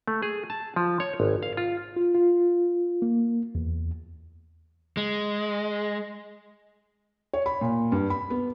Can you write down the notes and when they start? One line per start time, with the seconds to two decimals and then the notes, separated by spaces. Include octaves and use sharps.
0.08 A3
0.22 G#4
0.50 A5
0.76 F3
1.00 C#5
1.20 G#1
1.43 F5
1.57 F4
1.96 F4
2.15 F4
3.02 A#3
3.55 E2
4.97 G#3
7.34 C#5
7.46 B5
7.61 A#2
7.92 G2
8.10 B5
8.30 B3